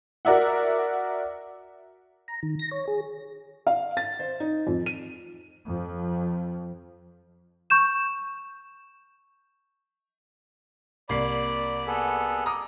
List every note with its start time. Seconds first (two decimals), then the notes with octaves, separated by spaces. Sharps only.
0.25 F#4 A#4 D5 E5 F#5
2.28 A#5
2.43 D#3
2.59 A#6
2.71 C#5
2.88 G#4
3.67 F5
3.97 A6
4.19 C5
4.40 D#4
4.67 F2
4.86 D#7
5.65 F2 F3
7.70 C#6 G6 E7
11.09 C2 A#3 D5 B5 C7
11.87 B3 G#4 A4
12.46 A#5 D6 D#6